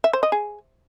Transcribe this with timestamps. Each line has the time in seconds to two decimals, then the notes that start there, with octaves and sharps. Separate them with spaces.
0.04 E5
0.13 C5
0.23 D#5
0.32 G#4